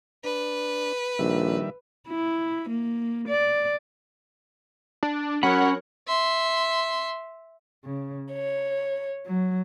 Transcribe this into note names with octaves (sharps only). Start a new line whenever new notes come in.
D4 B4
A#1 D#3 G3 E5
E4
A#3
D5
D4
F#3 C#4 A#4 C#5 F#5 B5
E5 C6
C#3
C#5
F#3